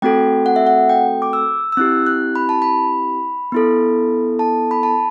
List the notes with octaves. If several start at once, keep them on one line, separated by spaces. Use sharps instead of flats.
A3 C4 F#4 A4 G5
F#5
E5
F#5
G5
D6
E6
E6
C4 E4 G4 F#6
F#6
B5
A5
B5
B3 E4 A4
A5
B5
A5